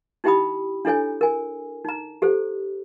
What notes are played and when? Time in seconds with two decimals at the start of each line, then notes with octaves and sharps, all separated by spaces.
0.24 D#4 E4 G4 G5 B5 D#6
0.85 D4 E4 A4 C#5 G#5
1.21 A#4 G#5
1.85 D#4 A#5
2.22 G4 A4 C5